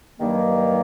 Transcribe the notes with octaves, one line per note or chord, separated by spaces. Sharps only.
G2 D#3 F#3 A#3